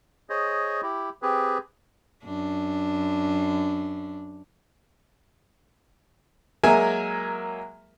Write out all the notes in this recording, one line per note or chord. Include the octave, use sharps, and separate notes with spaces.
G#4 C5 C#5 D#5
E4 G4
C4 G4 G#4 B4
F#2 D4
F#3 G#3 A#3 A#4 E5 G#5